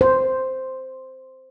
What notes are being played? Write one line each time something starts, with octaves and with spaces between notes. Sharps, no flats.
C5